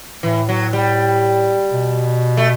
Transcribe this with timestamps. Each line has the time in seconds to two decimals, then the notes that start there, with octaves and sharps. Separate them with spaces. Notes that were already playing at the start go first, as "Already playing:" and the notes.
0.23 A2 E3
0.49 F#3
0.73 G3
1.73 B2
2.37 A3